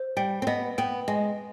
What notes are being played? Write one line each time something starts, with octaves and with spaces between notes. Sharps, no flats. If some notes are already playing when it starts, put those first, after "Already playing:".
Already playing: C5
G3 G5
C4
B3 D#5
B3 G5
G#3 D#5